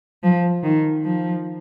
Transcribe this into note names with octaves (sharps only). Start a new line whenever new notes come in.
F3
D#3
F3